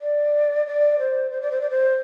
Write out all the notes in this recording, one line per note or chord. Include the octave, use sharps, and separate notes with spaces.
D5
D5
C5
C5
D5
C5
D5
C5